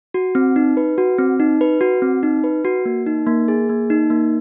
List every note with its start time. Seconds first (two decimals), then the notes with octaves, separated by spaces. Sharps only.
0.14 F#4
0.35 C4
0.56 D#4
0.77 B4
0.98 F#4
1.18 C4
1.40 D#4
1.61 B4
1.81 F#4
2.02 C4
2.23 D#4
2.44 B4
2.65 F#4
2.85 A#3
3.06 D#4
3.27 A#3
3.48 G#4
3.69 A#3
3.90 D#4
4.10 A#3